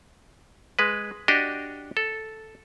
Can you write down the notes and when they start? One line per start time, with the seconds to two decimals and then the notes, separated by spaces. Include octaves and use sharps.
0.79 G#3 B4
1.28 D4 F#4 G4 D#5
1.97 A4